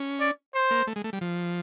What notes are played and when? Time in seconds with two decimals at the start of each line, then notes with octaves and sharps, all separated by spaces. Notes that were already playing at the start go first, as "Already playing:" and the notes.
Already playing: C#4
0.20 D5
0.54 C5
0.71 A#3
0.87 A3
0.96 G#3
1.04 A3
1.13 G3
1.21 F3